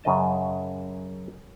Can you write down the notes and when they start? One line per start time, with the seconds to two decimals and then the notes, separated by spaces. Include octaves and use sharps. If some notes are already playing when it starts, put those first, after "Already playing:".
0.04 F#2 C#3 D#5 A5